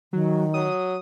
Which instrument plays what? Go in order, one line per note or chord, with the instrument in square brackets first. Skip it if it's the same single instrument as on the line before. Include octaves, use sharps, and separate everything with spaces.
[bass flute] D#3 [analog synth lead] F#3
[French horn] F#3 [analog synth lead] D#6